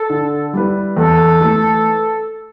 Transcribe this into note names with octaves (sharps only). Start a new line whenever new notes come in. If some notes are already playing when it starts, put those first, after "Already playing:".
Already playing: A4
D3
G3 E4 B4
E2 A4
E3 A3